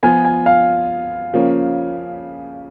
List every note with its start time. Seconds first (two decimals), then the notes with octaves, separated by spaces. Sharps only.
0.03 F3 B3 F4 G#5
0.25 G#5
0.46 F5
1.33 C#3 F3 A#3 C#4